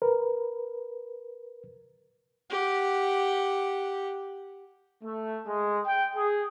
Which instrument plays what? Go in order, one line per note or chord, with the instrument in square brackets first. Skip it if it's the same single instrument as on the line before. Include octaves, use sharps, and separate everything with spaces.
[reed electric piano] A#4 B4
[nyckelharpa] G4 F#5
[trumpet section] A3
G#3
G5
G#4